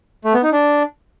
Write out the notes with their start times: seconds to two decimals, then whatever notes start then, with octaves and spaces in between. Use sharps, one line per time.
0.25 A3
0.34 B3
0.43 D#4
0.52 D4